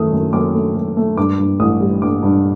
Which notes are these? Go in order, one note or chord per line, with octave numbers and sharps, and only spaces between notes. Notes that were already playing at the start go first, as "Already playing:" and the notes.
Already playing: F#2 D#3 A3 D#6
F#2
F#2 D6
A3
F#2
A3
G2 D6
G2
A1 D#6
G3
G2 D6
G2